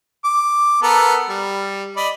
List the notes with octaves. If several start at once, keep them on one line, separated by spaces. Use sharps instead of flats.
D6
B3 A4 A#4
G3
D5 D#5 B5